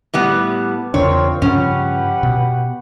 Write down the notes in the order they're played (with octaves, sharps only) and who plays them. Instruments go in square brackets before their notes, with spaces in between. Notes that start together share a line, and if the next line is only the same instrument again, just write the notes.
[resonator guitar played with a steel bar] A2 G3 B3
[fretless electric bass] E2 C#3 D4 [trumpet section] C4 F4 A#4 [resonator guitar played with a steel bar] C#5
[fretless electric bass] G2 C#3 F3 [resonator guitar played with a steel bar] C#4 [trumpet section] G4 B4 F#5
[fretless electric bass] B2